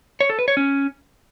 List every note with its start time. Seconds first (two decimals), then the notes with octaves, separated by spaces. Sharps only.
0.20 C#5
0.30 A4
0.39 B4
0.48 C#5
0.57 C#4